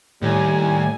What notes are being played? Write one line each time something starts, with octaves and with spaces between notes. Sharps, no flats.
D#2 A2 G3 G#5